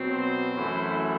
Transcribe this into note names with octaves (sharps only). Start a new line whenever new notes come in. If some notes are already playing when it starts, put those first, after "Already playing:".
Already playing: B2 F#3 C4
C5
F#2 E3 A3 E4